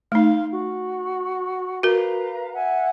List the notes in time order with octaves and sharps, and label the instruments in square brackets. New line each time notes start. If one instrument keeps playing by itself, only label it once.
[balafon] A3 D#4 [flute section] F5 C6
[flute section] F#4
[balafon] F#4 A#4 [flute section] B4 F5 A#5
[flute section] E5 F#5 G#5